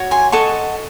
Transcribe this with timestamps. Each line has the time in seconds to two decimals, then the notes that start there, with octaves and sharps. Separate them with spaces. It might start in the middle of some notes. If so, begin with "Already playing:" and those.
Already playing: F#4 C#5
0.11 G#5 C6
0.32 F#4 A4 D#5 A5 C#6